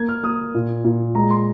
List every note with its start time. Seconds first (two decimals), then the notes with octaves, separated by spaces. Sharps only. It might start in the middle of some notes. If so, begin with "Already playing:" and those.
Already playing: A#3 G#6
0.09 F6
0.23 A#3 D#6
0.54 A#2
0.84 A#2
1.15 G#3 A#5
1.30 C6